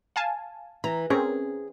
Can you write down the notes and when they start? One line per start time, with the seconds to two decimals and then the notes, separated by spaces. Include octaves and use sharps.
0.16 F5 G#5 A5
0.84 E3 A#5
1.10 C4 C#4 G#4 A#4